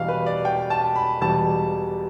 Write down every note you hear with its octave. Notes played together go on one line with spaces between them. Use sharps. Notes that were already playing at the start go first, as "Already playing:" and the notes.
Already playing: E1 E2 B2 G3 F5
B4
D5
G5
A5
B5
E1 E2 B2 G3 A5